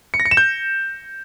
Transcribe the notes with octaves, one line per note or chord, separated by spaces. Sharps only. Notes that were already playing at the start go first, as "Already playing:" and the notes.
C#7
A#6
C#7
E7
G6